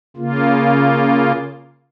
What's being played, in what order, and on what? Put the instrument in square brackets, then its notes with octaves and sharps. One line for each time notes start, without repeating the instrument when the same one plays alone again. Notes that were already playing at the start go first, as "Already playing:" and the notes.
[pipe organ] C#3 A#3 F4